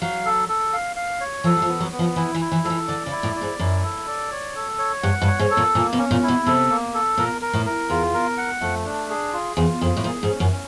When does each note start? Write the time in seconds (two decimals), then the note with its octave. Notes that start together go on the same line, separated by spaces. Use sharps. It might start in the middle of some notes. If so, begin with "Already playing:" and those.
0.01 F#3 F5
0.25 A4
0.49 A4
0.73 F5
0.96 F5
1.21 C#5
1.44 F3 A4
1.57 F#3
1.62 F3
1.69 B3
1.80 F#3
1.92 B3
1.99 F3
2.16 E3 E4
2.35 E3
2.40 E4
2.52 E3
2.64 F3 A4
2.70 E3
2.88 D3 D5
3.06 C#3
3.11 E4
3.23 A2
3.36 D5
3.41 G#2
3.59 F#2 E4
3.83 A4
4.07 D5
4.32 C#5
4.56 A4
4.79 C#5
5.03 G2 F#5
5.22 G2
5.27 C#5
5.39 G#2
5.51 A4
5.57 A#2
5.75 A#2 A#3
5.93 B2
5.99 C#4
6.11 A#2
6.23 E4
6.28 B2
6.46 C3 A4
6.70 A#3
6.94 A4
7.17 A#2 A#4
7.42 A#4
7.53 A2
7.66 A#4
7.90 E2 F4
8.14 A#4
8.38 F#5
8.61 F2 A3
8.85 D4
9.09 G#4
9.33 F4
9.57 E2 F4
9.81 F2 G#4
9.97 A2
10.04 A#2 G#4
10.23 G#2
10.29 C#4
10.40 F#2
10.52 C#4